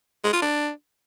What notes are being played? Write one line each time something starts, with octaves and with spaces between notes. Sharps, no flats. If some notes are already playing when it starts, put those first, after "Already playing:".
G#3
F4
D4